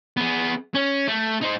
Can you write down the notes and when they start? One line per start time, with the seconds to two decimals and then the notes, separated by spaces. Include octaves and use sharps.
0.17 B3 G#4
0.75 C#4
1.08 A3
1.42 D#4 C5